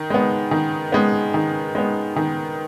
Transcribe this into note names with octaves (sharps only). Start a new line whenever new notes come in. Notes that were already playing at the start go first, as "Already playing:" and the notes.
Already playing: D#3
G#3 B3
D#3
G#3 B3
D#3
G#3 B3
D#3